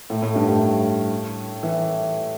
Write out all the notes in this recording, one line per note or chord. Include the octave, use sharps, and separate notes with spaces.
A2
A2
G2
A2
E3